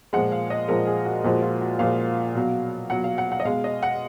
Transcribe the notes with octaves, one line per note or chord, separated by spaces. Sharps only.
A#2 F3 G#3 F#5
F5
D#5
A#2 F3 G#3 A#4
G#4
F#4
A#2 F3 G#3 F#4
F4
F#4
A#2 F3 G#3 F5
B2 F#3
B2 F#3 F#5
F5
F#5
F#5
D#5
B2 G#3 F5
D#5
F#5